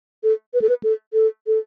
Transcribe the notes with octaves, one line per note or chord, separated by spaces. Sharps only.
A4
B4
A4
B4
A4
A4
A4